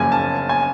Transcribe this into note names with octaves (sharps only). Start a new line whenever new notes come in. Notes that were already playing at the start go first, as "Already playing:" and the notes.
Already playing: F#1 F#2 C#3 F3 A#3 G#5
A5
A5
G#5